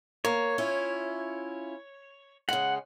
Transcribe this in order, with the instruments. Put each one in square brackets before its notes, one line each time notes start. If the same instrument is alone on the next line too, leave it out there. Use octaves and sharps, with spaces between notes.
[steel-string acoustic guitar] A#3 [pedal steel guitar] C#5
[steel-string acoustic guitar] C#4 E4 F4
[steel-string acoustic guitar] C#3 G#3 [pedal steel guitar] F#5